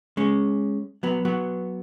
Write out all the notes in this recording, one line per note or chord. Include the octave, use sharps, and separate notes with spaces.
G#3 C#4
F#3 B3
F#3 B3